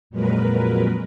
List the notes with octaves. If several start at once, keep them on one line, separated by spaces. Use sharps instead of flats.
F2 A#2 F#3 G#3 A#4 B4